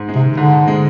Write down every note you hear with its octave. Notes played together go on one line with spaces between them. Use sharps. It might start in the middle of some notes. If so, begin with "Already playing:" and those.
Already playing: G#2
G#3
C3
D#3
G#2 D3
G#2
G#3